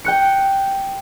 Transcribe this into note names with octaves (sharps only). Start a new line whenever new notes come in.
G5 F#6 C#7